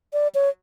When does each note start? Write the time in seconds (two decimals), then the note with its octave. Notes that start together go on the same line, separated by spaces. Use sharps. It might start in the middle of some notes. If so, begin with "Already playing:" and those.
0.13 D5
0.35 C#5